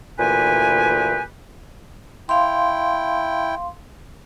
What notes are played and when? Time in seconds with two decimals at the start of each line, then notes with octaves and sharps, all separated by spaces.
0.18 D2 A#2 E3 G4 B4 G#5
2.29 E4 F5 G5 C6